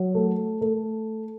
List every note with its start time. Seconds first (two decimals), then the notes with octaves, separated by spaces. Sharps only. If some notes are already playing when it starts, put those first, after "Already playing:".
Already playing: F#3
0.15 A3
0.61 A3